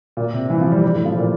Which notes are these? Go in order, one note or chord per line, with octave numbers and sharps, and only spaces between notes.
A#2
C3
E3
F3
G3
G3
A2
F3
A#2